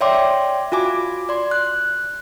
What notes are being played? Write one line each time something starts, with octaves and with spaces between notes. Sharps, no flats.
C#5 D5 E5 G5 C6 D6
F4 F#4 G#5 D6
D5 C6
F#6